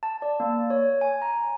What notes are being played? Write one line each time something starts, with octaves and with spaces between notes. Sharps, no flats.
A5
D5
A#3
C#5
G#5
A#5